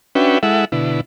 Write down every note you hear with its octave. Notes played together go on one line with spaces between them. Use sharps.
C#4 D4 F#4 B4 E5 G5
G#3 E4 A4 E5 F#5
B2 D3 E4